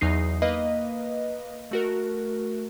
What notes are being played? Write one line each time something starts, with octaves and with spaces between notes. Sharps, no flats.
E2 F#3 D#4 C7
A#3 B4 D#5 F5
A3 F#4 A#4